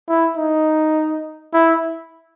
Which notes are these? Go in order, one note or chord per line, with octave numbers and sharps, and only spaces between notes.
E4
D#4
E4